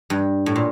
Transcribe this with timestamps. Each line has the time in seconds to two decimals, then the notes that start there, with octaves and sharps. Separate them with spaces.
0.10 G2
0.46 A2
0.56 A#2